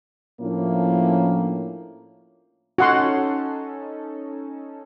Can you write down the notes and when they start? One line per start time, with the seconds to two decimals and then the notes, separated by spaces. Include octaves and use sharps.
0.41 A2 F3 A#3 C#4 D4 E4
2.78 C#4 D#4 F#4 A4 F#5 C6